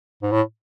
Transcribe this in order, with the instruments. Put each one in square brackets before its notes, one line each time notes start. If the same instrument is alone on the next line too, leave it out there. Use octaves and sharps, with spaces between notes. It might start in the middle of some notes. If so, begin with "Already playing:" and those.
[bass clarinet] G#2
A2